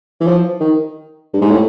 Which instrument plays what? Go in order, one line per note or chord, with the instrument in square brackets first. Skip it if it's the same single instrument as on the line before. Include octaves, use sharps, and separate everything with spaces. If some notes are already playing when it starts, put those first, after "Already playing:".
[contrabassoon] E3
F3
D#3
G2
G#2
A2